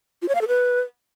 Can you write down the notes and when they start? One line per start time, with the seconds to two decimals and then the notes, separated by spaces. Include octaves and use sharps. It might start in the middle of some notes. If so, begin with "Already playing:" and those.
0.22 F4
0.29 C#5
0.35 F5
0.41 A4
0.48 B4